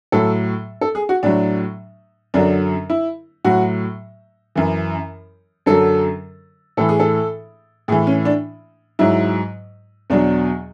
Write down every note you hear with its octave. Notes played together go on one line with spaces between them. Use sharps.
A2 F#3 A4
A4
G#4
F#4
A2 F#3 D4
F#2 D3 F#3 D4
E4
A2 F#3 F#4
F#2 E3
F#2 D3 F#3 A4
A2 E3 A4
G#4
A4
A2 E3 G#4
C#4
D4
G#2 F#3 E4
E2 B2 F#3 D4